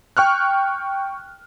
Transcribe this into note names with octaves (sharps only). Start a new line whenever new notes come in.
G5 C#6 F6 F#6